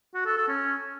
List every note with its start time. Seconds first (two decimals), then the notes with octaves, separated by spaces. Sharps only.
0.15 F#4
0.26 A4
0.37 A4
0.48 C#4